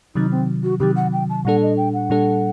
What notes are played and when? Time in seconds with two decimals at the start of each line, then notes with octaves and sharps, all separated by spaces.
0.15 C3 D#3 F#3 D#4
0.31 C4
0.63 F#4
0.79 C3 D#3 F#3 G4
0.96 F#5
1.12 G5
1.29 A5
1.45 A#2 G3 D4 A4 F#5
1.62 D#5
1.77 G5
1.93 F#5
2.10 A#2 G3 D4 A4